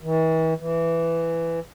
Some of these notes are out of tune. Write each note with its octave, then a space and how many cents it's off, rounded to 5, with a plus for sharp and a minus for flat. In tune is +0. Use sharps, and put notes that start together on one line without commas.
E3 -40
E3 +10